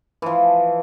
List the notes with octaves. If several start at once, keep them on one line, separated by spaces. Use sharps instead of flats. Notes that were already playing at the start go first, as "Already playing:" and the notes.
E3 F3